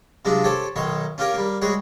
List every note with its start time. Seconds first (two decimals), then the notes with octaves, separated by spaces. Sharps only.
0.25 C3 F#3 G#3 D4 F4
0.44 G4 A4 C5 C#5
0.76 B1 D#3 C#5 C6
1.18 C#4 F4 G4 A#4 C#5
1.34 G3 A#3
1.62 G3 G#3 F#4 G#4 C#5